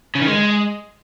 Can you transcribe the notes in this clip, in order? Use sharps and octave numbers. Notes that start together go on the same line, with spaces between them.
C#3
D#3
G#3